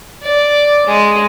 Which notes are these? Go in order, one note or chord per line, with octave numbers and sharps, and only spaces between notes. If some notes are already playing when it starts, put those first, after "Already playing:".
D5
G#3